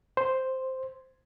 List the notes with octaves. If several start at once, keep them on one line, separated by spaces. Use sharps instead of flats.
C5